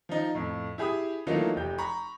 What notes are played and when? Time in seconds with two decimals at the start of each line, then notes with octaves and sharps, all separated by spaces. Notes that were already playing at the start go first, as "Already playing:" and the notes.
0.09 F3 D#4
0.35 F2 A2
0.78 E4 G4 G#4 B5 D#6
1.27 E3 F#3 A3 A#3 D#4 F4
1.56 F1 G4 G6
1.78 A#5 B5 C#6